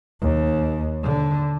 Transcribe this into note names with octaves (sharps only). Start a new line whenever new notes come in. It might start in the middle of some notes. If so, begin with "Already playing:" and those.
D#2
D3